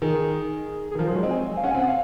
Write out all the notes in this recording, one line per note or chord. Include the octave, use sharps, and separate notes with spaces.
D#3 G#4
G#4
D#3
F3 A#4
F#3 C5
G#3 C#5
C4 D#5
G#5
F5
C#4 F#5
G#5
C4
F#5
F5